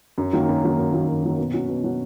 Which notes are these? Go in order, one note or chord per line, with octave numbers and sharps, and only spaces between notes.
F#2
D#3 F#3 A#3
F#2
D#3 F#3 A#3
F#2
D#3 F#3 A#3
F#2
D#3 F#3 A#3
B2
F#3 C#4 F#4
B2
F#3 C#4 F#4